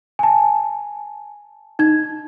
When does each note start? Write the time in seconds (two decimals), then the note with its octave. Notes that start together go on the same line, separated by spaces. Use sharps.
0.19 G#5 A5
1.79 D#4 G#6